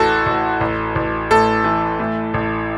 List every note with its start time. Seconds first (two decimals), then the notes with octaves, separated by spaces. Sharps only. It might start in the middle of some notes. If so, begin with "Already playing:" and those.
Already playing: A1 A2 E3 F#4 A4
0.26 A1
0.61 A1
0.95 A1
1.30 A2 A4
1.64 E3
1.99 A2
2.34 A1